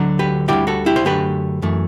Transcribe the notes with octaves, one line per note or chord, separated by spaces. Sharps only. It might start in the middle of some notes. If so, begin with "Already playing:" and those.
Already playing: D2 D3 F#3
G4 B4
D2 D3 G3 E4 G4
F#4 A4
E4 G4
C5
F#2 D3 A3 G4 B4
F#2 E3 A3